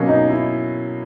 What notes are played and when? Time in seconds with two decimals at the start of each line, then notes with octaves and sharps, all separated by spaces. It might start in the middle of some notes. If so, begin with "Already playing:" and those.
Already playing: B2 F#3 A#3 C#4
0.08 D#4
0.29 E4